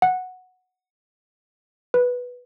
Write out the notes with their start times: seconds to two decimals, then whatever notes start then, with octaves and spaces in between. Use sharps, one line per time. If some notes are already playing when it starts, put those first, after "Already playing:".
0.02 F#5
1.94 B4